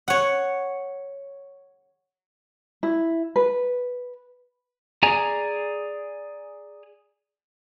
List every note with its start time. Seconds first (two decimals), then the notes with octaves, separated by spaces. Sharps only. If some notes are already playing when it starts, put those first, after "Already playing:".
0.08 C#5 F#5
2.83 E4
3.36 B4
5.03 G#4 D5 G#5 A#5